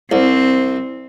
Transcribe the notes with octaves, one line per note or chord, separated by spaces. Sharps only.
C2 C4